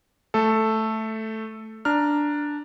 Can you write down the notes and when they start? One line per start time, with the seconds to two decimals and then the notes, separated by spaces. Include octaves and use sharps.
0.34 A3 A4
1.85 D4 A#5 F6